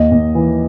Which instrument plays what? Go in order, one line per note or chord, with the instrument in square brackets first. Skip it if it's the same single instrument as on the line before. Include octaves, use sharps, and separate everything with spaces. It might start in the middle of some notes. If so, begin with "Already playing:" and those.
Already playing: [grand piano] D#2 D#5
D#2
E3